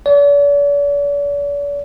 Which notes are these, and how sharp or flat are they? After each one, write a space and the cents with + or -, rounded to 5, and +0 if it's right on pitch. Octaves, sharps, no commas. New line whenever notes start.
D5 -45